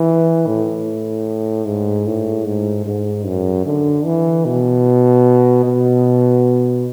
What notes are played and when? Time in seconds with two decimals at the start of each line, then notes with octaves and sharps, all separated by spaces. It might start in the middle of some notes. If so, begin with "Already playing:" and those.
Already playing: E3
0.47 A2
1.65 G#2
2.06 A2
2.45 G#2
2.86 G#2
3.26 F#2
3.66 D3
4.05 E3
4.45 B2
5.65 B2